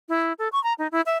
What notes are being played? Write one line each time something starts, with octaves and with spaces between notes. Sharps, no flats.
E4
A4
C#6
A#5
D#4
E4
E5